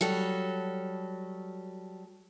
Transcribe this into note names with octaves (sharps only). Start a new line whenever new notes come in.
F#3 G3 A4